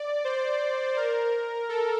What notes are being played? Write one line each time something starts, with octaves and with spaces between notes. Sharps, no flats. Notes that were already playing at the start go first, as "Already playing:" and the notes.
Already playing: D5
C5
A#4
A4